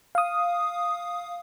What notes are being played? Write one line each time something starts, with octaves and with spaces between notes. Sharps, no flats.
F5 D#6